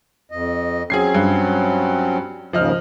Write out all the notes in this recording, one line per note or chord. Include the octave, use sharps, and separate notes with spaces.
F2 D#5
F#3 C4 C#4 G#4 G#6 C7
G2
D#2 G#2 C#3 F3 D#5 F6